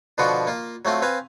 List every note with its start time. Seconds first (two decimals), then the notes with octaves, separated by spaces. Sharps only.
0.18 B2 D3 F3 B3 F4 F#4
0.47 A#3 F4
0.85 F#3 A3 C4 F4
1.02 C4 B4 F5 G#5